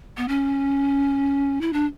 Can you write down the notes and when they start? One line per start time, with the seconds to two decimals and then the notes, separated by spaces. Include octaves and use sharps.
0.17 B3
0.28 C#4
1.61 E4
1.73 D4